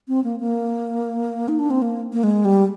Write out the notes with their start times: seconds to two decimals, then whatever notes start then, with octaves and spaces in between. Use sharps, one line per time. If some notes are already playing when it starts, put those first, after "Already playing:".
0.08 C4
0.24 A#3
0.40 A#3
1.48 D#4
1.59 D4
1.70 C4
1.82 A#3
2.13 A#3
2.23 G#3
2.45 G3